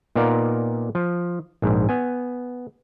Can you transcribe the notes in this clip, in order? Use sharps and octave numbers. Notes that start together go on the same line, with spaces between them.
A#2 B3 D#4 A#4 D5 F5
F3
A#1 G#2
B3 G#5